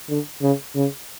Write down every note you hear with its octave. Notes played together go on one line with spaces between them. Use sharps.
D3
C#3
C#3